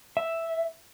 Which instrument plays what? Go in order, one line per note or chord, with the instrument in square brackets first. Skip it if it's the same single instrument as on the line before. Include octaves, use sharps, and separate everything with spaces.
[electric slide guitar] E5